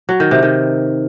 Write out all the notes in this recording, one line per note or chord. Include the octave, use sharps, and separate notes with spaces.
F#3
D#3
C3
D#3